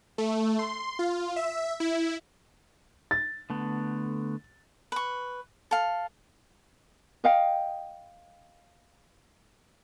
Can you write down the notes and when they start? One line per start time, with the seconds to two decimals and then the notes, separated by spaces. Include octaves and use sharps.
0.18 A3
0.59 C6
0.99 F4
1.36 E5
1.80 E4
3.11 A6
3.50 D3 A3 B3
4.92 B4 C#6
5.71 A4 F5
7.24 D#5 F5 G5